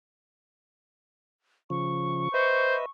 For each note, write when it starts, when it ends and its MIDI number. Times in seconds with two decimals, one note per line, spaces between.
1.70 2.29 49
1.70 2.29 53
1.70 2.90 85
2.34 2.85 71
2.34 2.75 72
2.34 2.85 75
2.34 2.85 76